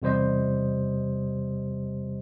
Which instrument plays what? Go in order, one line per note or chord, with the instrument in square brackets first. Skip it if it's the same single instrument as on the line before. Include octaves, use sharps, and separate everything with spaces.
[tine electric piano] E2 C3 G3 C5 D#5